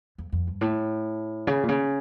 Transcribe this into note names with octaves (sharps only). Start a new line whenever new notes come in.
F2
F2
G2
A2
C#3
A#2
C#3